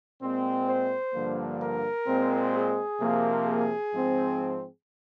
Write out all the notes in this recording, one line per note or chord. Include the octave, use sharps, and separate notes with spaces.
A#2 G#3 C4
C5
G2 D3 F3 A#3
A#4
A#2 G#3 C4
G#4
C3 F3 A#3
G#4
G#2 F3 C4